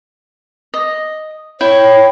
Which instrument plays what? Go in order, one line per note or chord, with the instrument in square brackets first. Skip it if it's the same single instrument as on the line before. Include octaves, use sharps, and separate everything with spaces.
[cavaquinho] D#5
[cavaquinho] E4 G5 [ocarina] C#5